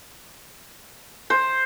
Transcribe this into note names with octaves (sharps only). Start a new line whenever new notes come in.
C5